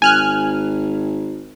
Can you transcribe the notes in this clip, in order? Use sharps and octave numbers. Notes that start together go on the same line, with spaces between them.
G#1 G#5 F6 F#6